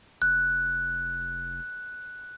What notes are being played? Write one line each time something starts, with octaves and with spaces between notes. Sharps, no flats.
F1 F#6